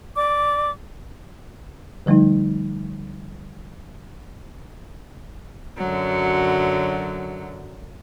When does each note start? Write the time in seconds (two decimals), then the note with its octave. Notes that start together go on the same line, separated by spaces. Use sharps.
0.16 D5 D6
2.06 D3 F3 G3 A3 D#4
5.78 F#2 D3 F#3